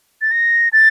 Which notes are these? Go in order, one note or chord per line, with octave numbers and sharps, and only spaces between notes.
A6
A#6
A6